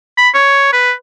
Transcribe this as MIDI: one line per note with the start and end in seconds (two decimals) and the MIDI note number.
0.18 0.29 83
0.34 0.71 73
0.73 0.92 71